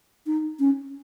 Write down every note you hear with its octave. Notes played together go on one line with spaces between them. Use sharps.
D#4
C#4